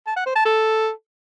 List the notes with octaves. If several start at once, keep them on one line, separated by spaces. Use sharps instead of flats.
A5
F#5
C5
A5
A4